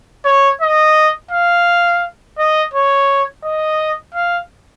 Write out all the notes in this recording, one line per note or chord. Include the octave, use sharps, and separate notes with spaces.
C#5
D#5
F5
D#5
C#5
D#5
F5